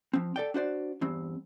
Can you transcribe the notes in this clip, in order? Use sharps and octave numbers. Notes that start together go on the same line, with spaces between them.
F3 C4
A4 D5 G5
D4 F#4 C5 D5
E2 G2 C4